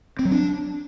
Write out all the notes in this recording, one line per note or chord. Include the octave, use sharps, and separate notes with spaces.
C4
F#3
D4